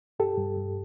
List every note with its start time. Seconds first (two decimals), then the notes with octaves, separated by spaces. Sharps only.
0.19 G2 G4 A4
0.38 G2
0.57 G2